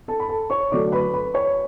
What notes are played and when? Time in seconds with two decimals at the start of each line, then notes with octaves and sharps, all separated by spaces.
0.08 A4 A5
0.20 B5
0.29 A4 A5
0.50 C#5 C#6
0.71 D3 F#3 A3 D5 D6
0.92 B4 B5
1.14 B4 B5
1.34 C#5 C#6